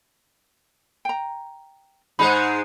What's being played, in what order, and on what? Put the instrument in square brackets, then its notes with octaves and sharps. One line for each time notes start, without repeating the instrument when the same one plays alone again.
[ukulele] G5 A#5
[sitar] G#2 G#3 D#4 [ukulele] G#4 B5